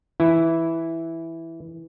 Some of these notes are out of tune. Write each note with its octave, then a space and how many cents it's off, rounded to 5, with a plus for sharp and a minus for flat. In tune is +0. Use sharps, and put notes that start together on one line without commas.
E3 +0 E4 +0